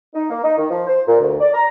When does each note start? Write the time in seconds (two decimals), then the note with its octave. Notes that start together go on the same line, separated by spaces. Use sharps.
0.15 D#4
0.30 A#3
0.44 D#4
0.57 D#3
0.70 F3
0.87 C5
1.07 A#2
1.21 D2
1.40 D5
1.54 A#5